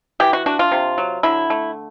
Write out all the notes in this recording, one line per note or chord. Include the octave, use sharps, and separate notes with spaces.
E3 G4
F#4
D4 F#4
F4
C3
F#3
D3 E4
A3